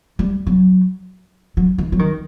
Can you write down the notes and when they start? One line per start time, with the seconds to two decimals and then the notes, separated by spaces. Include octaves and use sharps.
0.19 G3
0.47 F#3
1.57 F#3
1.78 D#3
1.92 F#3
1.99 D#3